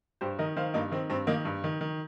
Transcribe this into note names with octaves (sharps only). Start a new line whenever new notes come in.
G2 G4 C5
D#3 A#4 D#5
D#3 C5 F5
G2 A#3 D#4
D#3 C4
G2 C4
D#3 A#3 D#4
G2
D#3
D#3